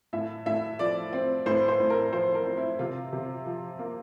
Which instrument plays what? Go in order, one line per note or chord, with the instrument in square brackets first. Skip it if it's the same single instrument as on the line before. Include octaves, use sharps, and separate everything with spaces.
[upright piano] A2 E5
A2 E5
F3 D5
C4
A2 C5
C5
A2
A#4
F3 C5
A#4
C4
E4
C3 F4
C3
F3
A#3